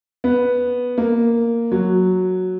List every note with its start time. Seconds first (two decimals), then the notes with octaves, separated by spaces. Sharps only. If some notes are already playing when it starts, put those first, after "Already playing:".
0.24 B3
0.98 A#3
1.72 F#3